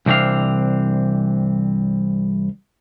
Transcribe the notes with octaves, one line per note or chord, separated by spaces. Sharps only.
C2 E3 C4 D4 F5